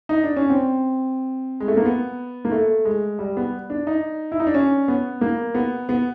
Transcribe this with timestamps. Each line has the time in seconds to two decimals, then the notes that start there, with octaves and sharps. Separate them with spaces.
0.09 D#4
0.24 D4
0.37 C#4
0.50 C4
1.60 G#3
1.68 A3
1.77 A#3
1.85 B3
2.45 A#3
2.52 A3
2.85 G#3
3.19 G3
3.37 B3
3.70 D4
3.87 D#4
4.32 E4
4.40 D#4
4.47 D4
4.54 C#4
4.88 B3
5.21 A#3
5.55 B3
5.89 B3